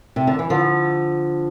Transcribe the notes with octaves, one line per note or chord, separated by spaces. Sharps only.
C3
D3
E3
D3 F3